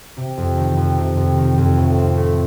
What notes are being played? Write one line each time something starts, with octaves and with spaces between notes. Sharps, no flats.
C3
F2
D#3
F2
C3
F2
D#3
F2
A2
C4
A3